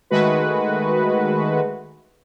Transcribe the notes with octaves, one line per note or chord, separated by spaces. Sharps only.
D#3 G#3 A3 F#4 B4